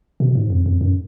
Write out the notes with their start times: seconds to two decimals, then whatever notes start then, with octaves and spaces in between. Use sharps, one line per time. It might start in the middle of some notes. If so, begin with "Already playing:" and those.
0.20 B2
0.35 G#2
0.50 F2
0.66 F2
0.81 F#2